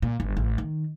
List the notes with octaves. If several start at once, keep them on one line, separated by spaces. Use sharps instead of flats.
A#2
G1
A1
D#3